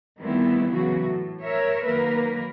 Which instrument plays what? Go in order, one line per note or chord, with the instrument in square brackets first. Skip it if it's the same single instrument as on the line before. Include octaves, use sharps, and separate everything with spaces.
[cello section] D#3 G3 A3 B3 C4 E4
C#3 E3 F#3 F#4
A2
A#4 C#5 E5
D#3 F#3 A#3 A#4 B4